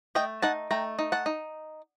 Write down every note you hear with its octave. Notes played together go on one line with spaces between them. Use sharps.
A3 D#5 G5
D#4 F#5 A5
A3 G5 A#5
D#4
F#5 A5
D#4